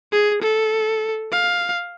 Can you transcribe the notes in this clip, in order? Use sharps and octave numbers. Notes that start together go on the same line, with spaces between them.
G#4
A4
F5